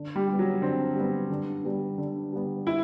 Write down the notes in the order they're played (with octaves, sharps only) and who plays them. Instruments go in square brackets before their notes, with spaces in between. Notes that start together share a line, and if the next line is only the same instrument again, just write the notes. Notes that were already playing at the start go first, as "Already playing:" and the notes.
Already playing: [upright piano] D3
[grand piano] G3
[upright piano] G3 B3
[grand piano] F#3
[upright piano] D3 [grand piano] C4
[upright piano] G3 B3
D3
G3 B3
D3
G3 B3
[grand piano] E4